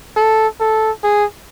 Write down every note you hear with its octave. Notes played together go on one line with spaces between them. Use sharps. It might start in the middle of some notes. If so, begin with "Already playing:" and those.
A4
A4
G#4